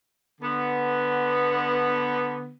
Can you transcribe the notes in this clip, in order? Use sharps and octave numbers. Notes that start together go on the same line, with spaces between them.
D3 B3